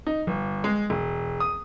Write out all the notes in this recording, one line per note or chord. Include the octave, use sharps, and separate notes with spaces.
D#4
G1
G#3
E1
D#6